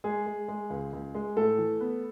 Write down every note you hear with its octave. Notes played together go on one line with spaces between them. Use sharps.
G#3 G#4
G#3
G#3
C#2
C#2
G#3
A2 A3 A4
E3
B3